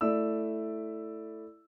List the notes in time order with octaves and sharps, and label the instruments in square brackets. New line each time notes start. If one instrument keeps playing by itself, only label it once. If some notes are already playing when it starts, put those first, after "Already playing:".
[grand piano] A3 E4 D5 E5 E6